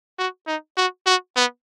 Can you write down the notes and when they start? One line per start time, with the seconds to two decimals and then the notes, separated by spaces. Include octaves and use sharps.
0.19 F#4
0.47 D#4
0.77 F#4
1.06 F#4
1.36 B3